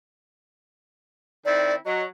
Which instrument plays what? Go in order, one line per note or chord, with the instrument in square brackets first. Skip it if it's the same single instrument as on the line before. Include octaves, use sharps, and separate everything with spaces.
[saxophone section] D#3 C4 E4 [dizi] D5
[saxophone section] F#3 [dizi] D#5